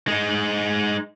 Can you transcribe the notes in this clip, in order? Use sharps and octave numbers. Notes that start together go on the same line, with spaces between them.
G#3 D#4